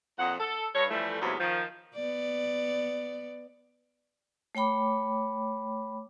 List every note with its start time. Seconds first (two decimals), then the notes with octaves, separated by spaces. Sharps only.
0.19 F2 A#2 D#5 F#5
0.40 A4
0.75 G2 C#5
0.90 E3 F3 G3 A3
1.22 E2 G#2 C3 F#3 A#3 B3
1.39 D#3 F3
1.95 B3 D5
4.55 A3 C#5 G5 B5 D6